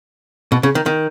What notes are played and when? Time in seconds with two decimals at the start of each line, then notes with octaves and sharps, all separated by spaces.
0.52 B2
0.63 C#3
0.75 D#3
0.86 D#3